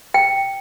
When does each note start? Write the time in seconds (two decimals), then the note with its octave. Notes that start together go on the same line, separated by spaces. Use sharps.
0.14 G5